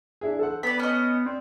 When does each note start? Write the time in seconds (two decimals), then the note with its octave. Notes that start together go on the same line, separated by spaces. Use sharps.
0.21 D4 E4 G#4
0.39 A4 C5 F#5
0.63 B3 D5 B5
0.80 C#4 D#5
1.26 C4 D5